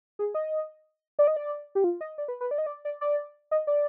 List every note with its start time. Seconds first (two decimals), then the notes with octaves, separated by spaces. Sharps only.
0.19 G#4
0.35 D#5
1.19 D5
1.27 D#5
1.36 D5
1.75 G4
1.84 F4
2.01 D#5
2.18 D5
2.28 B4
2.41 B4
2.51 D5
2.58 D#5
2.66 D5
2.85 D5
3.01 D5
3.51 D#5
3.67 D5